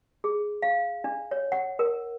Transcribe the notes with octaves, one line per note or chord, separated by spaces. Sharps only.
G#4
F5
D4
C#5
F#5
A#4